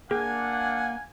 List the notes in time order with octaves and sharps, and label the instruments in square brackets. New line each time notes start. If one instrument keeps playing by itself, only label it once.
[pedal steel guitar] A#3 [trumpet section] D4 F5 F#5 [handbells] G#4 [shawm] G#5